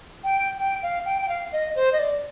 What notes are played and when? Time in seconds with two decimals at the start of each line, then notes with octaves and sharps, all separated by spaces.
0.24 G5
0.58 G5
0.82 F5
1.05 G5
1.22 G5
1.28 F5
1.52 D#5
1.75 C5
1.92 D#5
1.99 D5